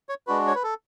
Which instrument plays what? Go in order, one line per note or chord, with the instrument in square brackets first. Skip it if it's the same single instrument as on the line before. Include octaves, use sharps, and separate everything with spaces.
[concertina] C#5
G#3 D4 F#4 B4
C#5
B4
A4